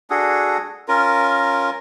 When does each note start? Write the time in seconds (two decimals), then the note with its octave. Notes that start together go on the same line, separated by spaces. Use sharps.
0.10 D4 F#4 G#4 A4
0.88 C#4 F4 A#4